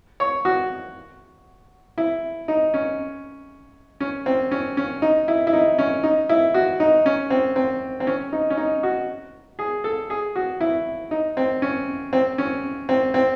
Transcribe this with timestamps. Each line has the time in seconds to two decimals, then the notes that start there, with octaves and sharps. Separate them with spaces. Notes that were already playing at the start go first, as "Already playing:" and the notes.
0.20 C#5
0.45 F#4
1.98 E4
2.48 D#4
2.74 C#4
4.00 C#4
4.26 C4
4.51 C#4
4.77 C#4
5.02 D#4
5.28 E4
5.47 E4
5.53 D#4
5.79 C#4
6.03 D#4
6.29 E4
6.54 F#4
6.80 D#4
7.06 C#4
7.30 C4
7.56 C4
8.00 C4
8.07 C#4
8.33 D#4
8.50 C#4
8.57 D#4
8.83 F#4
9.59 G#4
9.84 A4
10.10 G#4
10.36 F#4
10.61 E4
11.11 D#4
11.37 C4
11.62 C#4
12.13 C4
12.38 C#4
12.89 C4
13.14 C4